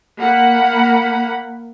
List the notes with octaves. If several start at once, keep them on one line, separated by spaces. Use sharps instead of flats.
A#3 F#5 B5